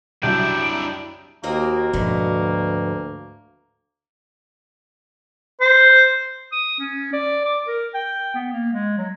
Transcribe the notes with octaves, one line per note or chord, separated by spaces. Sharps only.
C2 F#2 D4 E4 G5
D#2 A#3 C4 F#4 D#5
D2 G#2 B2 D3 F3 B3
C5
D#6
C#4
D5
D6
A#4
G5
B3
A#3
G#3
F#3